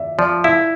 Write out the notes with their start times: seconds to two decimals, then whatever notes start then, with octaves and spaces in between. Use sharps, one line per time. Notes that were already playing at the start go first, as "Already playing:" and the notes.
Already playing: D5 E5
0.18 F3 D5
0.44 E4 E5